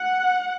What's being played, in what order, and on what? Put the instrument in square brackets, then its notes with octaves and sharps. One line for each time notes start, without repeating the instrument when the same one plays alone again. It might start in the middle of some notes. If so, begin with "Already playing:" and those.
Already playing: [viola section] F#5